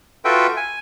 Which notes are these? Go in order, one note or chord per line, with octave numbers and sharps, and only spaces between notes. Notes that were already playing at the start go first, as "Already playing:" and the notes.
F4 F#4 A4 B4 E5 G5
G#5